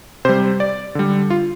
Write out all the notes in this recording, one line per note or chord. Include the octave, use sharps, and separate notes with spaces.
C3 G3 C5
D5
D3 G3
F4